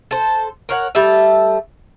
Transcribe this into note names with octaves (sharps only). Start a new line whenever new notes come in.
A4 C5
A#4 C#5 F#5
G3 A3 A4 E5